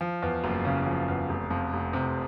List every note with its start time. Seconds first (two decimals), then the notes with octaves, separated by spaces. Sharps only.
0.01 F3
0.22 E2
0.44 F#1
0.65 C#3
0.87 F3
1.08 E2
1.29 F1
1.50 F2
1.73 F1
1.93 C3